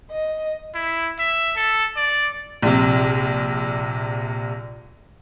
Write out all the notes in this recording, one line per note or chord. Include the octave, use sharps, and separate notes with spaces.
D#5
E4
E5
A4
D5
A#1 C3